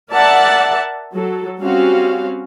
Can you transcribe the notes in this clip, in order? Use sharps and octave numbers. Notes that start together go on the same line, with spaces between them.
A#4 D5 E5 F#5 A5
F#3 A4
G3 C4 C#4 F#4 F5